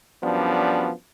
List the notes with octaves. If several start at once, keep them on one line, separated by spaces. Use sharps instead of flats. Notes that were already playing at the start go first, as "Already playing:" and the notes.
F#2 F3 G3 B3 D4